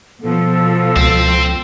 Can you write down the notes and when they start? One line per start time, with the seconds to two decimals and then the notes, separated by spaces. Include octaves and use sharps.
0.22 B2 F3 A4
0.96 C#2 C4